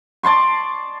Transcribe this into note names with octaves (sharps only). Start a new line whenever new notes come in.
D5 A5 C6 C#6